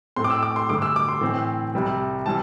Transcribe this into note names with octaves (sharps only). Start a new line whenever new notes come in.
A2 A3 C4 C6
D6
E6
D6
C6
G2 D3 A3 D6
E6
D6
C6
A2 E3 C4
C2 C3 G3 C4
E3 G3 C4 A5